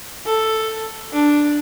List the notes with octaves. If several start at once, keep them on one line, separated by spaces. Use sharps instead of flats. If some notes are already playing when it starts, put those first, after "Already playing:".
A4
D4